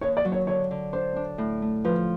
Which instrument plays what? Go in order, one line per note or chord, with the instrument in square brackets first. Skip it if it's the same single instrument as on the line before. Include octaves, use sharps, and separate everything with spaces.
[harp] D#2 [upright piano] C#5
[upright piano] D5
[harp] F#3
[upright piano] C#5
[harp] D3 [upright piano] C#5
[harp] D3
[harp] D4 [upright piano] C5
[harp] D4
A2
A3
[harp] F3 [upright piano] B4